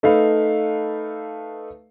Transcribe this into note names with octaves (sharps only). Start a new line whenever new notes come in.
A3 D#4 A4 B4 F5